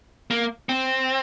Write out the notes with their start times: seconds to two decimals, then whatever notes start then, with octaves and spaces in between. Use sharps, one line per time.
0.31 A#3
0.69 C4